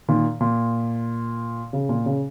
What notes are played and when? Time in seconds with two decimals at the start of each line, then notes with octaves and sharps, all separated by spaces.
0.08 A#2 D#3
0.40 A#2
1.73 C#3
1.89 A#2
2.06 C#3